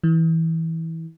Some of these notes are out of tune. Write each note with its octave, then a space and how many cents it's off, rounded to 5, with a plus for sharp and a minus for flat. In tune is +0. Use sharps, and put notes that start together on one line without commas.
E3 -20